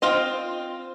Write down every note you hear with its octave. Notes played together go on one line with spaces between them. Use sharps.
C4 F4 C5 D#5